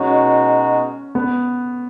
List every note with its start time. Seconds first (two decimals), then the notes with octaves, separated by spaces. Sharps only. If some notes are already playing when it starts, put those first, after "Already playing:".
Already playing: B2 G#3 C#4 D#4 F#4
1.15 B3